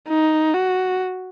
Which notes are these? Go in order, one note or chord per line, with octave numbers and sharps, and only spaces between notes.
D#4
F#4